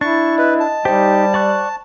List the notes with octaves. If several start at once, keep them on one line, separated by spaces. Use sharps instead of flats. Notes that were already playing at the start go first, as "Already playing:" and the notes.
D4 E4 C#6 A6
B4 D#5
A5
G3 D#4 G4 C5 G5
D5 C#6 F#6